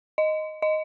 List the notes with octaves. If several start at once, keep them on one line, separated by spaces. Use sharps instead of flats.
D#5
D#5